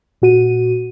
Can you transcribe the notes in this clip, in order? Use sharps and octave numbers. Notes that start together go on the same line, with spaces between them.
A#2 F#4 D#7